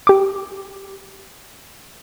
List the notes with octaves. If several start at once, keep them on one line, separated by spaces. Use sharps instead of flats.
G4 D6